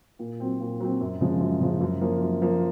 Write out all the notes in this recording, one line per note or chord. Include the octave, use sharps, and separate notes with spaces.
A#2
F#3 C4
A#2
F#3 C4
F#2
C#3 F3 G#3
F#2
C#3 F3 G#3
F#2
F3 A#3
F#2
F3 A#3